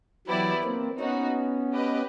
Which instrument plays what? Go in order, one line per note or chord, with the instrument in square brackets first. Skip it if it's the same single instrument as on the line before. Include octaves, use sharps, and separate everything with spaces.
[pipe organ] E3 F#3 [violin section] B3 E4 G4 B4 D5
[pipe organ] A#3 C4
[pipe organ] B3 C#4 [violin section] D#4 F#4 B4
[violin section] G4 B4 D#5